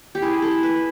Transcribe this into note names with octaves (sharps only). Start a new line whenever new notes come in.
G4
E4 G#4
A4
B4